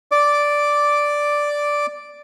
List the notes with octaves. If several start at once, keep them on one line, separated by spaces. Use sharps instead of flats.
D5 D6